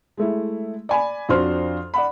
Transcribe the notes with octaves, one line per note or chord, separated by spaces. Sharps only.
G#3 A3 E4
D5 G#5 B5
F2 D4 F#4 C5 C6 F6
D5 F#5 B5